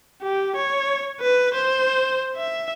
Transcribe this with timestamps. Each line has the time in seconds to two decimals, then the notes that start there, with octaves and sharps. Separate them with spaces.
0.23 G4
0.56 C#5
1.20 B4
1.54 C5
2.37 E5